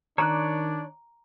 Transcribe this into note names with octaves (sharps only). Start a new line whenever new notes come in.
D#3 D4 C#5 D5 A#5 F#6